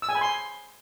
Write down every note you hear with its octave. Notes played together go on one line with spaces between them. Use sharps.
E6
G#5
B5
C6